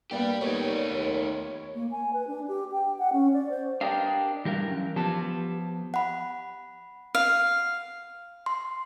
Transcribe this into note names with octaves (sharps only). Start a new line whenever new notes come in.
G2 G3 A#3 B3 G4
D#2 G3 A3 D#4 C#5
D#2
A#3
G#5
B4
D4
G4
G5
F#5
C#4
D5
C5
D4 G4 A#4 D#5 F5
G2 E3 G4 A#4 F5
F#2
F3 B3 G4 A5
F#5 B5
F5
C6